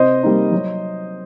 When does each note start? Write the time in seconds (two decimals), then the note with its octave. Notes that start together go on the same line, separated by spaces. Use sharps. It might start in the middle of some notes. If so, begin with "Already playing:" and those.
Already playing: C3 C5 D#5
0.23 G3 A#3 D#4
0.52 F#3